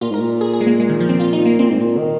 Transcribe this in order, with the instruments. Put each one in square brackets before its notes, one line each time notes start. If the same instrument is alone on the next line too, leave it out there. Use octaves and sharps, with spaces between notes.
[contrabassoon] A#2 [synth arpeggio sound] F4
[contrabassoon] G#2 [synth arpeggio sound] A#4
[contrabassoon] A#2
[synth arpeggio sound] G#4
G#4
G#3
A#3
G#3
D#3
F3
C4
F4
D#4
A#3
[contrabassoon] A#2 [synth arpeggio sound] C4
[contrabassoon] G#2
A#2
D#3